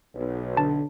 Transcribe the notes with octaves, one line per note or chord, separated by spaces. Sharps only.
B1
D3 A5